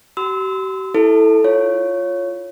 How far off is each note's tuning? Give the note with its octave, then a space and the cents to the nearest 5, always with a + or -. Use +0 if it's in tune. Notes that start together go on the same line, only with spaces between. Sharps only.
G4 -45 C6 -35 E6 -25
E4 -15 A4 +0
F4 +0 C#5 +0